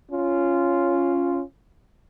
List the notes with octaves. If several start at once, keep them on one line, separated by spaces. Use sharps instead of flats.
C#4 F4